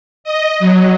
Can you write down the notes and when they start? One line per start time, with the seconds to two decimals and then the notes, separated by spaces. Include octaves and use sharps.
0.24 D#5
0.59 F#3